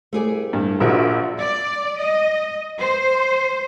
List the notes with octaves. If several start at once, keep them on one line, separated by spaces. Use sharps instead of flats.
C2 A3 G#4 D5
G2
A#1 G#2 F#4 A#4 E5
F4
D5
D#5
C5